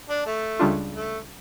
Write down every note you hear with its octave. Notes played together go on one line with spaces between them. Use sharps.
D4
A3
C#2 C#3 G3 D4 F4
A3